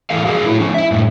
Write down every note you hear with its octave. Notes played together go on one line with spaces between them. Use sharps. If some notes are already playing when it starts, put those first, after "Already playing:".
E2 A2 E3 A4 A#4 F5
F3 F#3 G#4 A#4
A2 A3 E4
F3 C#4 D#4
E4 E5
F#2 A2